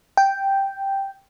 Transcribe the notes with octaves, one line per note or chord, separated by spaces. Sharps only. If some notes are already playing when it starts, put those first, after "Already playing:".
G5